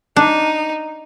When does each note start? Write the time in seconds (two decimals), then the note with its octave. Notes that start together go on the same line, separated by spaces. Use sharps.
0.16 D4 D#4